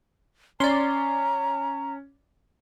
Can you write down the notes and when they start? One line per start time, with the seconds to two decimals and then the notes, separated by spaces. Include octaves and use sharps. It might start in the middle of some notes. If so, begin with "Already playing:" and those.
0.60 C#4 D5 A#5 C6